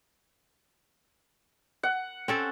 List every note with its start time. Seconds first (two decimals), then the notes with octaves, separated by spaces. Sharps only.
1.83 F#5
2.28 C4 C#4 A4